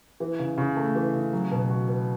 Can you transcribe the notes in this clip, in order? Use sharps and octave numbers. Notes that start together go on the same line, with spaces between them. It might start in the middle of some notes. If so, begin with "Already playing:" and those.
E3
C#3
C#3
A3
E3
C#3
F#3
B2
F#4
B3